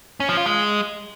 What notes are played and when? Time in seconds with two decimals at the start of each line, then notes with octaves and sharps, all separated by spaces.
0.20 C#4
0.29 F3
0.37 F4
0.46 G#3